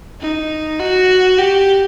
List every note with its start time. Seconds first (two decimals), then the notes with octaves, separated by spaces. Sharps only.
0.20 D#4
0.79 F#4
1.38 G4